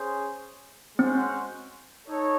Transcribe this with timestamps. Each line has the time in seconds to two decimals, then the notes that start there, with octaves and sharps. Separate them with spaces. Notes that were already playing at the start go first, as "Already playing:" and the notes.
Already playing: C#4 G#4 C5
0.98 G#3 C4 C#4 F#4 C5 F#5
2.08 D#4 A4 C#5